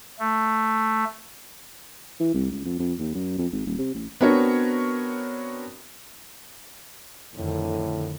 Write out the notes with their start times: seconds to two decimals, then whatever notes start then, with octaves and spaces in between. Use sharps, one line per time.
0.20 A3
2.20 E3
2.34 C2
2.51 C#2
2.65 F2
2.79 F2
2.99 D#2
3.15 F#2
3.38 F2
3.52 G#1
3.66 D#1
3.78 C3
3.94 A1
4.21 B3 C4 D4 F#4 A#4 C#5
7.35 F2 A2 D3 D#3